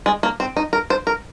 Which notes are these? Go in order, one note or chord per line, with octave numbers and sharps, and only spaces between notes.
G#3
A#3
C4
D#4
A#4
C5
A#4